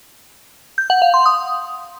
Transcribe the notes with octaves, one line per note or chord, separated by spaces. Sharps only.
G6
F#5
F5
C6
D#6